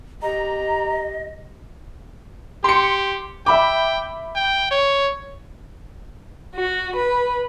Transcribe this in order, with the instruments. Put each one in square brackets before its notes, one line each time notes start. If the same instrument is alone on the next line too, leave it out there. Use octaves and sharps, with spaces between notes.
[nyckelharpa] G4 [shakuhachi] D#5 [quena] A#5
[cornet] G4 [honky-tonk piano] C6 C#7
[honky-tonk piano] E5 B5 D6 [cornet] G5
[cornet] G5
C#5
[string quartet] F#4
B4